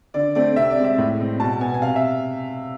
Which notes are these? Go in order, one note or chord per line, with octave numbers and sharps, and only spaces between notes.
D3 D5
A3 C4 D5
C3 E5
D5
G#3 C4
E5
A2
G#3 C4
B2 A5
B3 G#5
G#5
C3 F5
E5